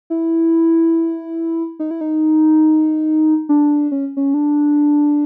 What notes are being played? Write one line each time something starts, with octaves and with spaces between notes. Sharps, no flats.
E4
D#4
E4
D#4
D4
C#4
C#4
D4